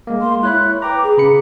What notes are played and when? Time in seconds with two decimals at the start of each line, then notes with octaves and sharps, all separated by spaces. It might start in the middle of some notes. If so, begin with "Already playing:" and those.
0.07 G#3 A#3
0.21 C6
0.43 E4 C#5 B5 F#6
0.82 B4 G5 A#5 D6
1.04 G#4
1.18 C#3 B5 C#7